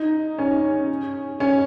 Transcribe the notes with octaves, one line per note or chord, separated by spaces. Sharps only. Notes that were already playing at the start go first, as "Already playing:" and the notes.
Already playing: D#4
C#4
C#4